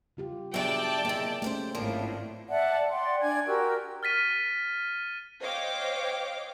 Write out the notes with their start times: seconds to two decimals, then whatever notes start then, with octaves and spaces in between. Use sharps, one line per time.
0.17 C#3 F4 G4
0.54 G2 F#3 B3 G#4 D5 E5 G5 A5
1.05 C3 D#3 A#3 G#4 E5
1.42 A3 C#4 G4 A#4 C5
1.75 G#1 A2 F3 A#3 D4
2.49 D5 E5 F#5 A5
2.90 D5 F#5 G5 C6
3.20 D4 G#5 G#6
3.46 F#4 G4 A#4 E6
4.03 F6 A6 B6 D#7
5.41 C5 C#5 D#5 F5 G5 D6